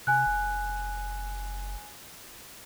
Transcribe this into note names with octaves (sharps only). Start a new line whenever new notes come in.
C3 G#5 F#6
F#1